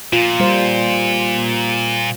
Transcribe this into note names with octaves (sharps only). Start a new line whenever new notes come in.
A#2 F4
G3 C5